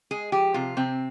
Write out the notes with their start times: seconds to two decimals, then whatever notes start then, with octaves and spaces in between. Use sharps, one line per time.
0.11 G#3 G#4
0.32 F3 G4
0.54 C3 F4
0.77 C3 C4